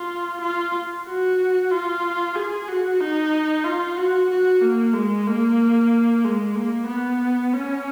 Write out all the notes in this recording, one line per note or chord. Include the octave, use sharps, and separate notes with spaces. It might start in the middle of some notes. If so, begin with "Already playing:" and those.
Already playing: F4
F4
F#4
F4
G#4
F#4
D#4
F4
F#4
F#4
A#3
G#3
A#3
G#3
A#3
B3
C#4